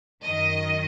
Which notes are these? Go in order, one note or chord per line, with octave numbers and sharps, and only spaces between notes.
F#2 D#3 D#5